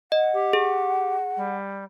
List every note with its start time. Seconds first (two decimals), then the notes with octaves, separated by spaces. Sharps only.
0.12 D#5 F#5
0.33 G4
0.53 G#4
1.36 G3